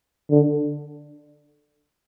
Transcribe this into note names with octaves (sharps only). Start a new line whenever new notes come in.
D3